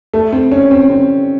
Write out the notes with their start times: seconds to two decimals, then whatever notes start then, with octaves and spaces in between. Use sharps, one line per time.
0.14 A3
0.32 C4
0.52 C#4
0.71 C4
0.90 C4